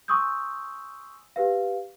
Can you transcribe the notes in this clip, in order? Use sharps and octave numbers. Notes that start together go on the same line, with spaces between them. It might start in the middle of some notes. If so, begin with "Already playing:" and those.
G#5 C6 C#6 D#6 E6 G6
G4 B4 F5